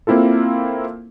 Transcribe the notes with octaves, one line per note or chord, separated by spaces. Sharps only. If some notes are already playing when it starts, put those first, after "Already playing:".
A#3 C4 E4 F4 A4